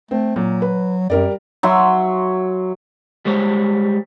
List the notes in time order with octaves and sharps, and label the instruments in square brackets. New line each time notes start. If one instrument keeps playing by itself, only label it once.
[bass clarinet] A3 [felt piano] C4
[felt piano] A#2 [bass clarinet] F#3
[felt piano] B4
[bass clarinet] F#2 [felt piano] G3 A#4 D5
[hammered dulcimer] F#3 E5 C6
[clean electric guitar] G3 G#3 C5 C#5